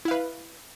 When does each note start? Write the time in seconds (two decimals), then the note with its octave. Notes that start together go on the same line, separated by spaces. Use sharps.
0.05 E4
0.08 F5
0.11 B4